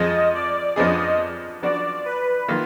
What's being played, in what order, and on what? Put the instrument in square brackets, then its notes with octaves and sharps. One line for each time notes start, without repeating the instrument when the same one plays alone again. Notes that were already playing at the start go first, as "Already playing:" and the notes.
Already playing: [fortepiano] F2 F3 G#3 [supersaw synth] D#5
[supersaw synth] D5
[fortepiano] F2 F3 B3 D4 G#4 [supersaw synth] D#5
[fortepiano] F3 B3 D4 F#4 [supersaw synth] D5
[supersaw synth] B4
[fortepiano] D#3 A#3 F4